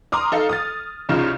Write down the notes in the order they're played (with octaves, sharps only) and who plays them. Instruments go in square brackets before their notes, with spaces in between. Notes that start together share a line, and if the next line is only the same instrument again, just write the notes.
[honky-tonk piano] A#5 C6 D6 D#6 F6
D#4 A4 F5
D#6 F6 A6
C2 C#3 D#4 F4